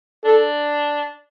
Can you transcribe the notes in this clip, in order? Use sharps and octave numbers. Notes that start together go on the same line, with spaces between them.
D4 A4